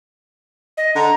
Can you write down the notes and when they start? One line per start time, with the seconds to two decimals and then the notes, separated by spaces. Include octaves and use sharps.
0.77 D#5
0.95 D3 A#5